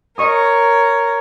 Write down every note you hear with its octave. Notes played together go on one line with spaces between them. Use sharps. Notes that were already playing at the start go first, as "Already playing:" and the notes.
A#4 C#5 D#5 C#6 D#6